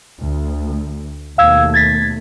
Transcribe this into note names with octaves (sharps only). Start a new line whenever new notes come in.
D2
D#2 B2 A3 F5 E6 G#6
G#6 A6 B6